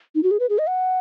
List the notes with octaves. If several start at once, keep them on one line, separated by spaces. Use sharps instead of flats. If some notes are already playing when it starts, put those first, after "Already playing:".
D#4
F#4
G#4
B4
G#4
D#5
F#5